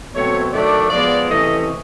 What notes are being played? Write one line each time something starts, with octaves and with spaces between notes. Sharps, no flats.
B2 F#3 A3 C4 C#5
D#3 F#3 A3 D4 D5
F3 G#3 B3 D5
C3 E3 A3 C#4 D#5